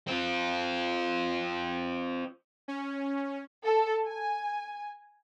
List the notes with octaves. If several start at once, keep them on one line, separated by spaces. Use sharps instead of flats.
C4 F4
C#4
A4
G#5